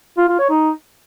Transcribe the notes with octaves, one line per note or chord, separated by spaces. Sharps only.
F4
F4
C#5
D#4